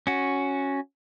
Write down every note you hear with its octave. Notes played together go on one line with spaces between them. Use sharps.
C#4 F#4